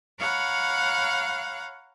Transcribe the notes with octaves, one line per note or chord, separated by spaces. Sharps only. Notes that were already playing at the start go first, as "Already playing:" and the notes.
C#5 F5 F#5 A#5 B5